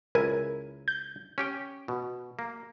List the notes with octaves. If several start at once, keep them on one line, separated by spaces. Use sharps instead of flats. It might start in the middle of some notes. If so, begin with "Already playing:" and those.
C#2 E4 A#4 G#5
G6
C#4 G4 G5
B2
A#3